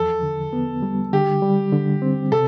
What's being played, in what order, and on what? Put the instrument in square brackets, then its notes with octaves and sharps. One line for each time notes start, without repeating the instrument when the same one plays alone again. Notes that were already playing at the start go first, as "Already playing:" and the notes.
Already playing: [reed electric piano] E2 F3 [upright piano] A4
[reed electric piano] D3
B3
G3
[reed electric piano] D3 [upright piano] G4
[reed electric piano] G3
D3
C4
[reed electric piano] C3 [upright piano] A4